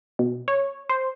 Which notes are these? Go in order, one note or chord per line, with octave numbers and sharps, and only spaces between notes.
B2
C#5
C5